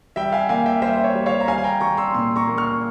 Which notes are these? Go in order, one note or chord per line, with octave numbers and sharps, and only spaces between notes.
G3 E5 G5
F5 G#5
A#3 F5 G#5
E5 G5
G3 C5 E5
C#5
G3
C#5 F5
A#5
G3 F5 G#5
G#5
G5 A#5
G3 A#5 C#6
C6 E6
A#2 C6 E6
A#5 C#6
A#3
C#6 F6